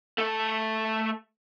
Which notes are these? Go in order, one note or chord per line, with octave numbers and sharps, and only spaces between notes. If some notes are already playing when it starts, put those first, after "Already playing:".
A3 A4